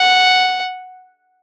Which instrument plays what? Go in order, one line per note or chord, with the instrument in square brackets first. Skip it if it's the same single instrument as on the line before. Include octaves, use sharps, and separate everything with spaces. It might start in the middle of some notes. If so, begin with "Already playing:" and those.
Already playing: [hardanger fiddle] F#5